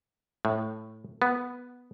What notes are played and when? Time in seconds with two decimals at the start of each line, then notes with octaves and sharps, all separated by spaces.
0.45 A2
1.22 B3